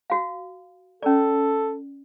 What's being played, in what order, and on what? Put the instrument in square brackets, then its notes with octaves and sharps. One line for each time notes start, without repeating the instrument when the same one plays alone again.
[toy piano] F#4 F5
[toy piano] C#4 D5 [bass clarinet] A4